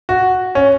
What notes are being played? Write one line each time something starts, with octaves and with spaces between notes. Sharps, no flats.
F#4
C#4